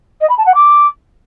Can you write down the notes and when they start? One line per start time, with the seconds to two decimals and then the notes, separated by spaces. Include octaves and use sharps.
0.21 D#5
0.29 B5
0.38 A5
0.46 F#5
0.55 D6